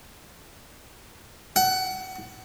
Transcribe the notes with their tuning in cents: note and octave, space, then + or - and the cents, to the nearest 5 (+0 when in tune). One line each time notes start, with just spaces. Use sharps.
F#5 +25